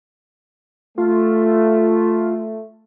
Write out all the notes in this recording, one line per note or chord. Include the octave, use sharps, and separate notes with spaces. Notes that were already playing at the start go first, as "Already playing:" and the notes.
A3 F4